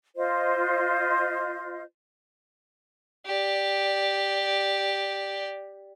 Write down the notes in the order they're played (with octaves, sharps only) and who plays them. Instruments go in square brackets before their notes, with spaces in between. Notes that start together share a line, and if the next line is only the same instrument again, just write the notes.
[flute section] F4 C5 D#5
[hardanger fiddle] G4 D5